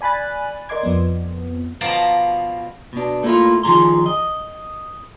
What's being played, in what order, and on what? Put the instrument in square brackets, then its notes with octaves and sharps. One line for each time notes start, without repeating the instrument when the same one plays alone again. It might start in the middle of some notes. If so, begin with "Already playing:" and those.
[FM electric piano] D5 G#5 B5 F#6 A6
A#4 D5 D#5 C6 D6 G#6
F2 F3 B3
[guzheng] B2 F3 D5 A5 A#5
[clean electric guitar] B2 D4
A3 A#3 D4 E4 F4
D#3 F3 G#4 A#5 C6
D#5